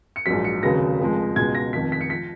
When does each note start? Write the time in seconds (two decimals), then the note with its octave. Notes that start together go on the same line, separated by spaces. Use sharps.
0.16 C#7
0.26 A#1 G#2 F#3 B6
0.44 C#7
0.63 F1 D#2 C#3 F#3 A#6
1.00 F1 F2 F3 G#3
1.36 C#2 B2 G#3 G#6
1.55 A#6
1.73 F1 F2 D#3 B6
1.92 B6
2.01 C#7
2.10 F3 B6